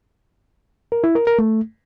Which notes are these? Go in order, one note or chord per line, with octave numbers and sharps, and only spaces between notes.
A#4
E4
A#4
A#4
A3